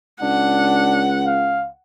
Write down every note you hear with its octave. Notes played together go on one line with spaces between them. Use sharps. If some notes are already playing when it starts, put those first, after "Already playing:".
C#2 D4 F#5
F5